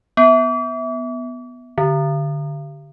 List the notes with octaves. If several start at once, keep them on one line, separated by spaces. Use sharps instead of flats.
B3
D3